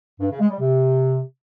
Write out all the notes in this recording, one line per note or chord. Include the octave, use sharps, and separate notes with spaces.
G2
C#3
G#3
G3
C3